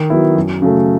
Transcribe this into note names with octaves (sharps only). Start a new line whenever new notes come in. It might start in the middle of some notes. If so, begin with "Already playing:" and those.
Already playing: D#3
F#3 B3 E4
F#2
C#3 F#3 A3